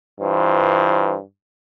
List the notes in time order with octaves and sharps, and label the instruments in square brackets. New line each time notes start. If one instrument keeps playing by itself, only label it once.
[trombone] G2 [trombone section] E3 F4 C5